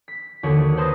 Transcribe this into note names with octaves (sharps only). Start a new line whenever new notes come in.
B6
D#2 D3 F#4 C#5
B4 C5 A5 D#6 A#6